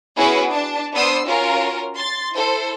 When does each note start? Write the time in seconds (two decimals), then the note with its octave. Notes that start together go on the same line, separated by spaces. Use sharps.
0.16 B3 C#4 E4 F#4 G#4 B4
0.50 D4 A5
0.94 B3 D4 C5 D#6 E6 C7
1.27 C#4 F4 F#4 A#4
1.96 C6 A6
2.35 E4 A4 C5